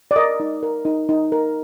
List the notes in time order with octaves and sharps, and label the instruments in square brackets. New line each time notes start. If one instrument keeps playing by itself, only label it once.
[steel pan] D5
A#4 D#5
D#4
A#4
D#4
D#4
A#4